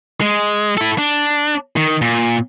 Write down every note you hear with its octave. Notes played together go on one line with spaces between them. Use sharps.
G#3
E4 A4
D4
D#3
A#2